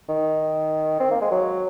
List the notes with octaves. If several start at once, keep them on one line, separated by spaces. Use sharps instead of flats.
D#3
C4
A#3
G#3
F#3